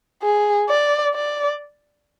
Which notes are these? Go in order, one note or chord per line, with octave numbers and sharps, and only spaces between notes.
G#4
D5
D5